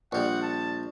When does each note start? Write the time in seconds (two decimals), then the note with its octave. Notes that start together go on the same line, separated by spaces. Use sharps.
0.13 A#1 G3 F#5
0.42 A5